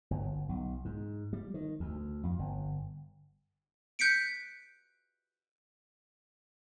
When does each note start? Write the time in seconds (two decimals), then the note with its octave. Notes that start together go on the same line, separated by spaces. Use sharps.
0.11 G1
0.49 B1
0.85 G#2
1.33 G3
1.54 D#3
1.80 D2
2.23 F2
2.39 G1
3.99 F#6 G6 B6 C#7 D7